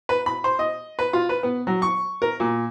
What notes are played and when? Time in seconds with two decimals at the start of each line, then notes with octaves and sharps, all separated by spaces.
0.09 B4
0.26 B5
0.44 C5
0.59 D#5
0.99 B4
1.13 F4
1.29 B4
1.43 B3
1.67 F#3
1.82 C#6
2.22 A#4
2.40 A#2